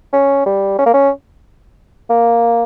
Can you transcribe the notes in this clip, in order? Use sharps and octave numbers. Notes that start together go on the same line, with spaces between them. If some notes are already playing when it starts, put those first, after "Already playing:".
C#4
G3
C#4
A#3
C#4
A#3